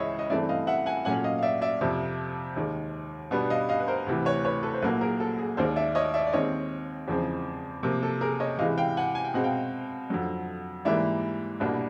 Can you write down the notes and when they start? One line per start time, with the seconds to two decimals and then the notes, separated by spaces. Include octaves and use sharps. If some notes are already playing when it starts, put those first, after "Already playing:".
Already playing: C#2 C#3 E3 C#5 D#5 E5
0.19 D#5
0.30 G2 E3 A3 C4 D5 E5
0.49 D#5 F5
0.67 E5 F#5
0.86 F#5 G#5
1.05 A#2 F#3 A3 C#4 F#5 G#5
1.24 D#5 F5
1.39 F5
1.43 D5 E5
1.62 D5 E5
1.81 F2 C3 F3
2.56 D#2 D#3 G#3
3.31 B2 G3 B3 D4
3.50 D#5 F5
3.69 D#5 F5
3.80 B4
3.87 A#4 C5
4.06 D2 C3 E3
4.25 B4 C#5
4.45 B4 C#5
4.63 A4 B4
4.74 C5
4.82 C2 A#2 F#3 A#3 A4 B4
5.01 G#4 A#4
5.20 A4
5.38 G#4
5.57 D#2 D#3 G#3 C5 D5
5.76 D5 E5
5.95 C#5 D#5
6.14 D5 E5
6.27 D5
6.33 D#2 D#3 G#3 C4 C#5 D#5
7.08 E2 C#3 F3 G#3 C4
7.83 C3 F3 A#3
8.03 A4
8.21 G#4 A#4
8.40 C#5 D#5
8.58 C3 E3 G#3 D#5 F5
8.78 F5 G5
8.97 F#5 G#5
9.15 G#5
9.24 G5
9.34 B2 G#3 C4 F#5
9.44 F5 G5
10.10 F2 D3 F#3
10.85 G#2 E3 G3 A#3 D5 E5
11.60 C2 B2 G3 A#3 D4